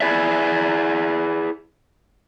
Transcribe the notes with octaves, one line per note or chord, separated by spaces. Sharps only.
E4 G#4 D5 E5